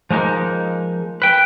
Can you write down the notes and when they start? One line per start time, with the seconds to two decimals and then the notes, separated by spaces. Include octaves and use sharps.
0.10 F3 G#3 A#3 D#4
1.22 B4 G5